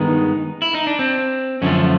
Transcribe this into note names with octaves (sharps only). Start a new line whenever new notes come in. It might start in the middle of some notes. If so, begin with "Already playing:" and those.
Already playing: G2 D#3 G#3 B3 D#4
E4
D#4
D4
C4
F#2 D3 F3 A3 C#4